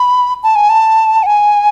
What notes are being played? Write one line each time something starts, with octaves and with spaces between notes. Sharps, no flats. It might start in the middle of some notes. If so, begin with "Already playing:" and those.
Already playing: B5
A5
G#5
A5
F#5
G#5